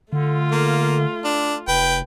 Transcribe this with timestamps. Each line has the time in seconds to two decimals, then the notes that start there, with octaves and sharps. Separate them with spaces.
0.13 D3 A3 F4
0.52 A#3
1.25 D4
1.68 F1 B4 G5